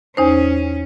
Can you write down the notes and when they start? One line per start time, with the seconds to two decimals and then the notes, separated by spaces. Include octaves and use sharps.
0.17 E2 C#4 D#4 C5